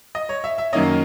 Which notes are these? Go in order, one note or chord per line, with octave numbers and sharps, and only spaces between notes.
D#5
C#5
E5
E5
F#2 D#3 A#3 C#4 D#5